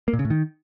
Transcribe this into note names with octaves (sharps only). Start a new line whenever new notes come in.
A#3
A#2
C#3
A2
D#3